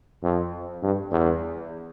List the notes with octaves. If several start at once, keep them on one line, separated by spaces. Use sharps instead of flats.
F2
G2
E2